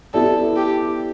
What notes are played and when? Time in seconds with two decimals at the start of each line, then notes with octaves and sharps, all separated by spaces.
0.14 B3 E4 G4 A4 D5
0.56 G4